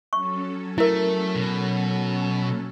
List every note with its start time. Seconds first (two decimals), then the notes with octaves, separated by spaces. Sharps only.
0.13 F#3 C#4 A4 C#6
0.78 A3 E4 A#4
1.35 B2